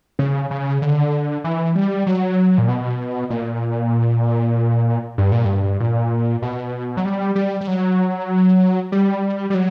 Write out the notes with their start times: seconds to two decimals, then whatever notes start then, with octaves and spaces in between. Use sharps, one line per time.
0.19 C#3
0.51 C#3
0.82 D3
1.44 E3
1.75 G3
2.06 F#3
2.58 A#2
2.68 B2
3.30 A#2
5.18 G2
5.32 A#2
5.45 G2
5.80 A#2
6.42 B2
6.97 F#3
7.05 G3
7.35 G3
7.61 G3
7.67 F#3
8.92 G3
9.50 G3
9.54 F#3